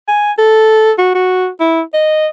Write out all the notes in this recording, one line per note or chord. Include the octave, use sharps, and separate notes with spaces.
G#5
A4
F#4
F#4
E4
D#5